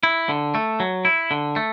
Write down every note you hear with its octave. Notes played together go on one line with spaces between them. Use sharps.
E4
D3
A3
F#3
E4
D3
A3